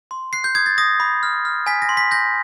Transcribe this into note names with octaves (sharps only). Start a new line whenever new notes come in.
C6
F#6 C7
G6
D#6 G#6
A6
D#6 A#6
B5
F6
F6
G#5 B6
A#6
C6
B6
G6 A#6